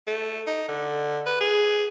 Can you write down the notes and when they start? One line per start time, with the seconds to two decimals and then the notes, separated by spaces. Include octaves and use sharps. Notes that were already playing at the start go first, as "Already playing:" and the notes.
0.07 A3
0.47 D#4
0.68 D3
1.26 B4
1.40 G#4